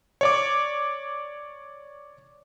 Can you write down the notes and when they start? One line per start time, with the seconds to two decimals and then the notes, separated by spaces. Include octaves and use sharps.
0.21 C#5 D5 D6